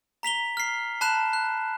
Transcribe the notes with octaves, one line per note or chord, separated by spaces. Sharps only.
A#5 B6 F7 G7
F6 C7
A5 B5 F#6 E7
F#6